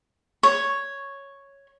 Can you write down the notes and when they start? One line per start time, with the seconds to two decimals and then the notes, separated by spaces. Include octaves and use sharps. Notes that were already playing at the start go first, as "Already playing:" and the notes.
0.43 C#5